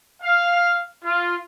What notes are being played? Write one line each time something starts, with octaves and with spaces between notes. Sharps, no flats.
F5
F4